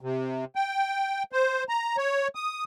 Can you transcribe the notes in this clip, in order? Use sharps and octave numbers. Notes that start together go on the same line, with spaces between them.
C3
G5
C5
A#5
C#5
D#6